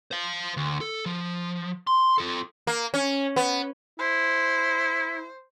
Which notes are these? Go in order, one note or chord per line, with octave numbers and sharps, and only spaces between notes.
C5 F5
D2
A4
F3
C6
F4 A4
A#3
C#4
B3
E4 C5